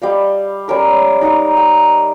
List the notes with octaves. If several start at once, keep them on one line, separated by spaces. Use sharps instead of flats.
G3 D#5 F5
G3 C#4 A#4 B5
D#4 A#5 C#6 D6
G5